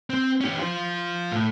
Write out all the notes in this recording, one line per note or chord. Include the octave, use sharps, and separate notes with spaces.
C4
C#4 G4
F4 C5
A2